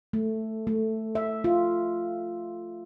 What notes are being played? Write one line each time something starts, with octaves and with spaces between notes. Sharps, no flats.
A3
A3
E5
F4